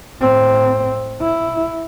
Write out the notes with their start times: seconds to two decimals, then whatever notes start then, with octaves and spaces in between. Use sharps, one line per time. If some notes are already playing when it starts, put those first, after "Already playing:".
0.20 A2 C4
1.22 E4